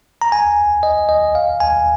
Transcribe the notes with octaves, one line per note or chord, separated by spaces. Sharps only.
A#5
G#5
D#5
D#5
F5
G#5